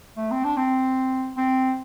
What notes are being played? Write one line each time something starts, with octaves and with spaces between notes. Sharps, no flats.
A3
C4
D4
C4
C4